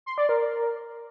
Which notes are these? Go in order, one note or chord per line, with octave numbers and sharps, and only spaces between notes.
C6
D5
A#4